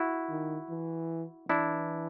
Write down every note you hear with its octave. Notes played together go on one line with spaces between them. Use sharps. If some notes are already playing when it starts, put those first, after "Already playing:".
Already playing: E4 F#4
D#3
E3
E3 D4 E4